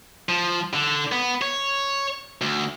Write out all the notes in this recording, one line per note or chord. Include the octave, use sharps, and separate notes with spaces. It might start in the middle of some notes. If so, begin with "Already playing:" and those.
F3
D3
B3
C#5
D2